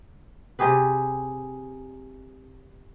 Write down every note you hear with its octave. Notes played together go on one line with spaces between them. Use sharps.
C3 G4 G#4 B4